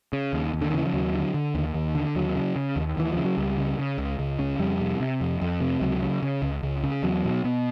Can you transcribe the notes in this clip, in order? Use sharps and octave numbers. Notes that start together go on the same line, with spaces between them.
C#3
D#2
D#2
D3
D#3
C#3 E3
F3
D#2 F#3
D3
D3
D#2
D#2
D3
D#2 F#3
C#3
C#3
D#2
D#2 E3
C#3 F3
F#3
C#2 G3
C#3
C#3
C#2
C#2
C#3
F2 G3
C3
C3
F2
F2
C3
C#2 F#3
C#3
C#3
C#2
C#2
C#3
E2 F#3
B2
B2